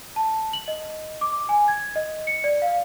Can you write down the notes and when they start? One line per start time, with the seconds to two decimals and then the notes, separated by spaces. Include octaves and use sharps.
0.16 A5
0.53 F#7
0.68 D#5
1.21 D6
1.49 G#5
1.68 G#6
1.96 D#5
2.27 C#7
2.44 D5
2.62 F5